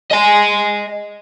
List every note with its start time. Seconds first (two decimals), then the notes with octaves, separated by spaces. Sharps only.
0.11 D#5 G#5